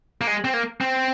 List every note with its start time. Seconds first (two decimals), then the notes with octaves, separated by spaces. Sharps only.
0.21 A#3
0.27 G#3
0.44 C4
0.54 A#3
0.81 C4